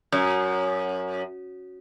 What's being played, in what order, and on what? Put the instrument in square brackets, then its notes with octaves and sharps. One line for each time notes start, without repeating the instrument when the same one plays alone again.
[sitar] F#2